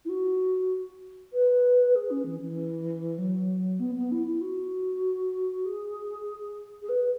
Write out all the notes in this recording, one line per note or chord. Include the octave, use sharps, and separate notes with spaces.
E4
F#4
B4
G#4
C#4
E3
E3
F#3
B3
B3
E4
E4
F#4
G#4
G#4
B4